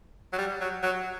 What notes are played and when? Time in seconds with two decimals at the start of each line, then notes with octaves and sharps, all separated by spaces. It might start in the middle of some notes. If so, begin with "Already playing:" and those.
0.33 F#3
0.38 G3
0.61 F#3
0.83 F#3